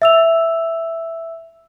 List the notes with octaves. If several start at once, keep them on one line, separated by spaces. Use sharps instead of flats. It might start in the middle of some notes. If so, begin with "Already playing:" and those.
E5 E6 F7